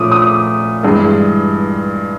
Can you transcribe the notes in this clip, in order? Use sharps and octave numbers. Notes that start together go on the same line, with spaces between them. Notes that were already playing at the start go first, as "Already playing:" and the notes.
Already playing: A#2 F3 A3 C#4 D6 D#6
D#6
G2 E3 G#3